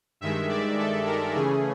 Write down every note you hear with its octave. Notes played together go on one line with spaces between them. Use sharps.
G2 D#3 G#3 E5
D5
A4
A#4
C#3 E3 A3 C#4 G#4